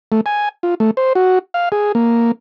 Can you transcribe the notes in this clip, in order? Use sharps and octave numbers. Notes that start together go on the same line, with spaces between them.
A3
G#5
F4
A3
C5
F#4
F5
G#4
A#3